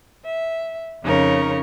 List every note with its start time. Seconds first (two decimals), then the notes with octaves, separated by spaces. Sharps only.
0.25 E5
1.02 F2 C#3 D#4 A#4 C#5